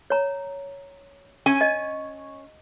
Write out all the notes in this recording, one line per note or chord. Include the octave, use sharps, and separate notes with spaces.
C#5 A#5
C#4 G#5
D#5